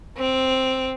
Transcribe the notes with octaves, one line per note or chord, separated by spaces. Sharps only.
C4